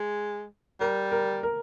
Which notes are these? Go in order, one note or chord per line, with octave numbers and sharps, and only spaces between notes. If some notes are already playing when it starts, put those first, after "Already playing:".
Already playing: G#3
G3 A#4
A#4
A#4